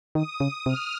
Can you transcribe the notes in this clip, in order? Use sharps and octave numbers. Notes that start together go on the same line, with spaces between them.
D#3 D#6
C#3
C3 F6